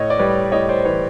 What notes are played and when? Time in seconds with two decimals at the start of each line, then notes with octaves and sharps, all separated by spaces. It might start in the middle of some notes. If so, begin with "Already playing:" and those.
Already playing: A2 C#5 D#5
0.10 D5
0.19 G3 B4 C#5
0.52 A2 C#5 D#5
0.69 C5 D5
0.85 E3 B4 C#5